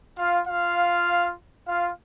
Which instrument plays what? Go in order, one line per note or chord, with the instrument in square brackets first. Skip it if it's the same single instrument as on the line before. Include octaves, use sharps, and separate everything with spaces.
[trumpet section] F4 F5
F4 F5
F4 F5